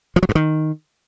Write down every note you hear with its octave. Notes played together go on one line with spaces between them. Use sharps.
F3
F#3
G2
D#3